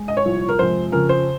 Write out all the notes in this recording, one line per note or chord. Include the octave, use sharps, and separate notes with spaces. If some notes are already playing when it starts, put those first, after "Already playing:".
Already playing: G#3
D#5
C#5
C2 A#2 F3
A#4
F2 C3 F3 G#3 C5
F2 C#3 F3 A#4
C5